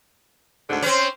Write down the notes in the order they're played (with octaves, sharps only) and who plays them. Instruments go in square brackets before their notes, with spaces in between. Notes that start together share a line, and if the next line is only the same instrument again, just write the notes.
[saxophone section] D2 G#2 D3
[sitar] C4 C#4 [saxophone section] C5